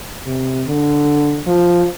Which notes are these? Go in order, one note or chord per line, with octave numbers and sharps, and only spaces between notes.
C3
D3
F3